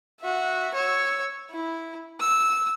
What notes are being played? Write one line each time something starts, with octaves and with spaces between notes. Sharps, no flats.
F#4 E5
C#5 E6
E4
E6